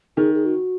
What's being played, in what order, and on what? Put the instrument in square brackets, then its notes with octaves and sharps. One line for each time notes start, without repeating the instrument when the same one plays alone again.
[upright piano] D#3 [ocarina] G#4
[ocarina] G#4
F#4